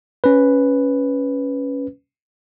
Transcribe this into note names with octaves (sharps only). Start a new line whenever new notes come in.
C#4 B4